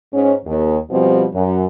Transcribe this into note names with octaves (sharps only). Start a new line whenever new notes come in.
G#2 C#4
D#2
B2 F3 G3 C4
F#2